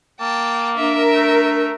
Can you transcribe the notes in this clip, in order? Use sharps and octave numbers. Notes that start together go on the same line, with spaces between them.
A#3 G5 A5
D4 A#4 E5
A3